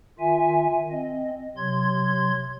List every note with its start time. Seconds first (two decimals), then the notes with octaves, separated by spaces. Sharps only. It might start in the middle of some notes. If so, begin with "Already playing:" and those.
0.19 D#3 F4 E5 G#5
0.91 C4 D#5
1.57 C3 F#3 C6 G#6